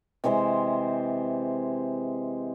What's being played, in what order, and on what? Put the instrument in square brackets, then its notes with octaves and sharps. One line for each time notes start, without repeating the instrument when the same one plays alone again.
[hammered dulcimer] C3 E3 G#3 C5